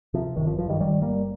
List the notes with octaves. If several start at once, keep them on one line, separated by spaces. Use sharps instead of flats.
C3 F3
G1 D#3
F3
G2 F3
D#3 G3
G1 D#3 G3
G1 G3 A#3